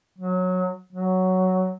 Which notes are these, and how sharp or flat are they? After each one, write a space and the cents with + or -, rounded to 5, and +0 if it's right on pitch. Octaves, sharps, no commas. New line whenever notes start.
F#3 -15
F#3 +5